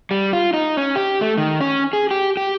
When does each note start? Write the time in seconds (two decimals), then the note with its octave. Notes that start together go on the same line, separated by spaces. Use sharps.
0.11 G3
0.33 F4
0.54 D#4
0.77 C#4
0.95 G4
1.21 A3
1.38 D#3
1.61 C#4
1.93 G#4
2.11 G4
2.37 G4